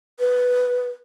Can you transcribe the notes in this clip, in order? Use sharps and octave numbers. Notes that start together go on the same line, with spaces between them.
B4